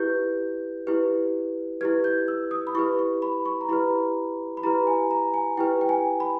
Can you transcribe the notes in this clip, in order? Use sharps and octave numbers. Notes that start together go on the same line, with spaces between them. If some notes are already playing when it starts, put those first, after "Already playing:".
Already playing: E4 G4 B4 G6
E4 G4 B4
E4 G4 B4 G#6
G6
E6
D#6
B5
E4 G4 B4 C#6
C#6
B5
C#6
A#5
E4 G4 B4 B5
B5
E4 G4 B4 A#5
G#5
A#5
G#5
E4 G4 B4 G5
G5
G#5
B5